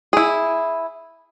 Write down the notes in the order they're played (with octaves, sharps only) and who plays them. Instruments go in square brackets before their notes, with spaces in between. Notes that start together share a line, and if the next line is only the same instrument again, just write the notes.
[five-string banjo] E4 G#4